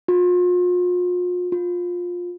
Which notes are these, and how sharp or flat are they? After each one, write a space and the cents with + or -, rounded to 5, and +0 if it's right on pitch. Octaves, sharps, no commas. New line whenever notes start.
F4 +40
F4 +20